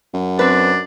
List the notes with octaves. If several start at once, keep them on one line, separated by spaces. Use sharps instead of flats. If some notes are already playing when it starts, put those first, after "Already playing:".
F#2
C4 D4 B4